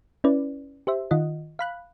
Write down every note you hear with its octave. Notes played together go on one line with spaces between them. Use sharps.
C#4 E4 B4 D5
G4 C5 E5
D#3 F4 D#5 F#5
F5 B5 F#6